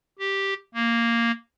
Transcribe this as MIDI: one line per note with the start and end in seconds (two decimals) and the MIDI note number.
0.19 0.54 67
0.74 1.32 58